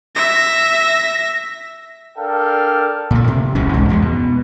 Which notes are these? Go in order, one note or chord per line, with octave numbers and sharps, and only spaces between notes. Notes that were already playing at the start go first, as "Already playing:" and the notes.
E5 A#6
D4 A4 A#4 D5 F5 G5
A#2 A3
C3
E1 C2 A2 C#4
C2 G#2
E2 G#2 F#3 G#3
B2